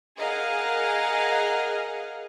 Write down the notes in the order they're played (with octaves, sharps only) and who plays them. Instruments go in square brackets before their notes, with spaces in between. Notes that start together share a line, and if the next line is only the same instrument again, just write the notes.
[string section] G#4 A#4 D#5 F5 F#5 G#5